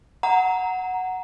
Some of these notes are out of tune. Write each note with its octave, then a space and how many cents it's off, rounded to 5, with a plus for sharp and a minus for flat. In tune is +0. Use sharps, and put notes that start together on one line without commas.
F#5 +0 A#5 +0